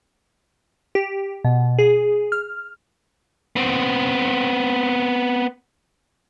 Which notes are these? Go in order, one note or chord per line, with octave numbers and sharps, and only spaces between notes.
G4
B2
G#4
F6
B3 C4